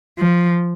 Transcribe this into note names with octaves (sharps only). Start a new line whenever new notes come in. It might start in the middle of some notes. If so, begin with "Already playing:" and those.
F3